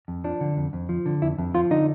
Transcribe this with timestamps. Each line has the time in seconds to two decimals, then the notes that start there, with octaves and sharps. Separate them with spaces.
0.08 F2
0.24 F3 D4
0.41 D3
0.57 F2
0.73 F2
0.89 F3
1.06 D3
1.22 F2 E4
1.38 F2
1.54 F3 F4
1.71 D3 D#4